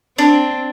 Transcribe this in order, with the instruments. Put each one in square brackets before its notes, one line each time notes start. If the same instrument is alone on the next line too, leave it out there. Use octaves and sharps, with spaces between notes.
[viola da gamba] C4 [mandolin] D4